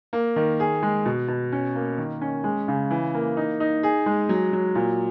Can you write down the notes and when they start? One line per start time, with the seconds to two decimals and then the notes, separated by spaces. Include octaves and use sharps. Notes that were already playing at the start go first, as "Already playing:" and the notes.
0.13 A#3
0.36 D#3
0.60 G#4
0.83 G#3
1.05 B2
1.28 B2
1.52 C#4
1.75 A#3
1.98 D#3
2.21 C#4
2.44 G#3
2.68 C#3
2.91 E3
3.14 A#3
3.37 D#4
3.60 D#4
3.83 G#4
4.06 G#3
4.29 F#3
4.53 F#3
4.75 A#2